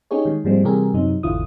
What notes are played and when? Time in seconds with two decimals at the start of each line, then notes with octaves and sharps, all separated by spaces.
0.11 C#4 D#4 G4 G#4 C#5
0.25 D#3 G#3
0.44 G#2 F3 G3 G#3 A#3 C4
0.64 C3 E3 G3 G4 G#4 A#4
0.94 F#2 C3 F#3 D#4
1.23 G#1 E2 D3 E4 F4 D#6